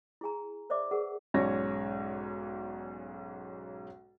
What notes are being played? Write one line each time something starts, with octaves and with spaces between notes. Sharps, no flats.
E4 G#4 G#5 A#5
A#4 C5 D5 E5 D6
G#4 A#4 B4 F#5
B1 G#2 C#4 C#5 D5 A#6